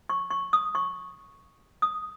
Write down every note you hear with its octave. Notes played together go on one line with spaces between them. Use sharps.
C#6
C#6
D#6
C#6
D#6